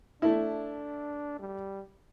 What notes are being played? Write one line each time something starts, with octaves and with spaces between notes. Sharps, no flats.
A3 D4 E4
G3